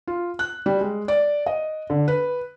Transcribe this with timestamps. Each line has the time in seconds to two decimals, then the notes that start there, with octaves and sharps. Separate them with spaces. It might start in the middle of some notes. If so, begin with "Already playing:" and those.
0.07 F4
0.39 F#6
0.66 G3
0.81 G#3
1.08 D5
1.46 D#5
1.90 D3
2.08 B4